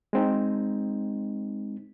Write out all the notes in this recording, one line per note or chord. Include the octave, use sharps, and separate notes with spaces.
G#3 C4 D#4